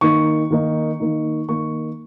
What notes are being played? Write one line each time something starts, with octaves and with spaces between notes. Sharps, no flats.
D#3 A#3 D#4 C#6
D#3 A#3 D#4
D#3 A#3 D#4
D#3 A#3 D#4 C#6